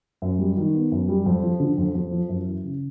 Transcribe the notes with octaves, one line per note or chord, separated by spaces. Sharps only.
F#2
G3
D#3
B3
F#2
G3
F2
F3
D3
F2
F2
F3
F#2
E3
C#3